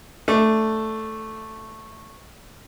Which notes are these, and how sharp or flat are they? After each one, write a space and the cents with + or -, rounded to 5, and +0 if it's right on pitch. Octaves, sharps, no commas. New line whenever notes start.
A3 +0 D4 +0